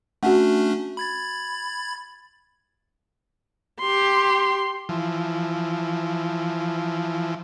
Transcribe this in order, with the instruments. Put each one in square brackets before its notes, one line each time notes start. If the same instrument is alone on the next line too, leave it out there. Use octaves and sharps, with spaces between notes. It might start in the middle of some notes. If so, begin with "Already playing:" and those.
[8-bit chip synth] A3 C#4 D4 [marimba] F#4 F#5
[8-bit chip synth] B5 G#6 A6
[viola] G4 C6
[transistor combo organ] E3 F3